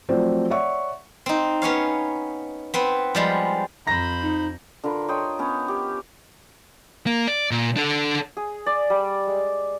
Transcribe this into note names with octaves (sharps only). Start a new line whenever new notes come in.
F3 F#3 A3 C4 C5 D5
C#5 D5 E5 F#5 C#6
C4 D#4
B3 C#4 C#5 F5
B3 C4 B4
F3 G3 G#3
F2 C5 A#5 B5 A#6
D#4
D3 F4 A#4 B4
C#5 D#5 G5 C6
B3 C#4
G4
A#3
D5
A#2
D4 A4
G#4
D5
G3
G#3